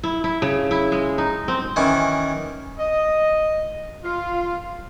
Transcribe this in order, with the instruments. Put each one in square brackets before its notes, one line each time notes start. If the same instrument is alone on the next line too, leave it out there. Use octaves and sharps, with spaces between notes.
[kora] E4
E4
C#3
E4
G#3
D#4
C4
[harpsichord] D#3 E3 C#4 D6
[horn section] D#5
F4